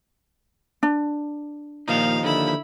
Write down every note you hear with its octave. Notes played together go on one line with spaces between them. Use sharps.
D4
D#2 A#2 F3 D#4 F5
D3 E4 B5